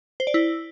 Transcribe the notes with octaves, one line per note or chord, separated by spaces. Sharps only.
C5
D5
E4